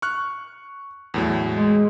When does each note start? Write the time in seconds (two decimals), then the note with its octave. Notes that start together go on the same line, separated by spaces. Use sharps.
0.02 C#6 F6 F#6
1.14 E2 A2 F#3
1.51 G#3